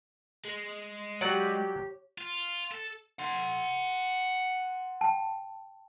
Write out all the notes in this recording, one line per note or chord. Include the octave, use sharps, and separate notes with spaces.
G#3
F#3 G4 C#5 D5 F#5
F4
A4
F#5 C6
G5 A5